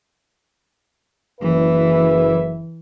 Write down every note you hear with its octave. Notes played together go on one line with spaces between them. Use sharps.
F#1 E3 B4 E5